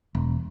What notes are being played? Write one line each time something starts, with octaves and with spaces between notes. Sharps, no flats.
E1